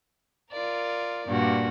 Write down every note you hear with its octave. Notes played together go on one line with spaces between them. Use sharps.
F4 A#4 D5
G2 A#2 A#3 F#4